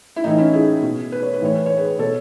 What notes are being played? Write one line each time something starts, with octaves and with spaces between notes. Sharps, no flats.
E4
A2 E3 D#4
C#4 E4
E4 G#4
B2
B4
C#5
B4
A2 E3 C#5
B4
C#5
G#4 B4
B2 A4 C#5